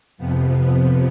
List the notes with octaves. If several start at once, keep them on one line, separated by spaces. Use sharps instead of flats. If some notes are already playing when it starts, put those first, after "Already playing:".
F2 C3 F3 B3